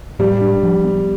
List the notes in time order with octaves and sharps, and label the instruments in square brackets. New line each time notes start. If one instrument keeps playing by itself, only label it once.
[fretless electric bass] A2 [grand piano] G3
[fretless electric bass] D4
F3
B3